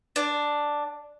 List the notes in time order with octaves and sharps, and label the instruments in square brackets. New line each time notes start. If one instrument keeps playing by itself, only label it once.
[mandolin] D4